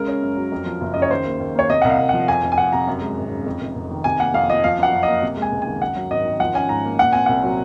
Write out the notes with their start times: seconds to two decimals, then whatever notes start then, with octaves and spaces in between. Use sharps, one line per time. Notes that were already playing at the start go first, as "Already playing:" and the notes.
Already playing: C#3 G#3 A#4
0.08 C#4
0.22 F#2
0.37 F#3
0.52 F2
0.66 F3
0.81 F#1
0.94 C#3 D#5
1.02 C#5
1.11 D#3 C5
1.25 D#2
1.40 D#2
1.55 A#3 C#5
1.70 C3 D#5
1.82 C2 F#5
1.90 F5
1.99 C2
2.09 F3 F#5
2.28 F2 G#5
2.43 F1
2.52 G#5
2.58 F1 F#5
2.73 C3 A#5
2.87 F#2
3.01 G#3
3.17 G#1
3.31 C#3
3.46 F2
3.61 F1
3.75 F1
3.91 D#3
4.04 C3 G#5
4.19 A#3 F#5
4.34 F2 F5
4.49 F3 D#5
4.64 F3 F5
4.79 F#2 F#5
4.93 F#2
5.03 A#3 D#5
5.22 C3
5.37 G#3
5.42 G#5
5.52 C#2
5.62 D#3 G#5
5.81 F#2 F#5
5.96 F#3
6.11 G#1 D#5
6.25 D#3
6.40 F3 F#5
6.54 C#4 G#5
6.69 G#2 A#5
6.84 A#3
6.99 A#2 F#5
7.13 C4 G#5
7.26 C2 F#5
7.43 F#3